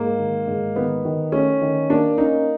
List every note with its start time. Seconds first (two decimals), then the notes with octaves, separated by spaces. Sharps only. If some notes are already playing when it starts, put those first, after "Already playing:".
Already playing: G#2 A#3
0.19 D#3
0.48 G#2
0.76 D#3 B3
1.05 D#3
1.32 A3 C#4
1.62 D#3
1.90 A#3 D4
2.18 C#4 D#4